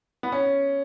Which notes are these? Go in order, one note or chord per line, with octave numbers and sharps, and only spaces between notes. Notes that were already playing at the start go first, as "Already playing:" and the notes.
B3
C#4